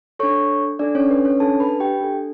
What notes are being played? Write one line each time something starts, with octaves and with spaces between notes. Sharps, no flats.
D4 A4 C#5 C#6
D4 A4 D5
C#4 C#5
B4
C#4 C#5
D4 A4 A5
B4 B5
G4 G5
D4 A4